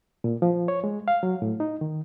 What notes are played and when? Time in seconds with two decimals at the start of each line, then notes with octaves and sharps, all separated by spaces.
0.24 A#2
0.42 F3
0.68 C#5
0.84 G#3
1.08 F5
1.23 F#3
1.42 A2
1.60 D#4
1.81 D#3